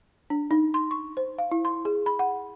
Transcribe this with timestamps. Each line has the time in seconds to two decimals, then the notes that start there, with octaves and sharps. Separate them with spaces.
0.30 D4
0.51 D#4
0.74 C6
0.91 C#6
1.17 C5
1.38 F5
1.51 E4
1.65 C6
1.85 G#4
2.06 B5
2.19 F#5